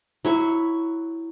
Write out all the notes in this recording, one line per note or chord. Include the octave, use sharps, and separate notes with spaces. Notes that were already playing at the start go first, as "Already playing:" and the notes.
F#3 E4 C#6